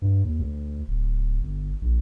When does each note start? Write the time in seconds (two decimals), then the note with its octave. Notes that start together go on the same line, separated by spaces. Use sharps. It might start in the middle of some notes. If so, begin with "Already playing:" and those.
0.02 G2
0.24 D#2
0.39 D2
0.88 D1
1.42 G1
1.82 A#1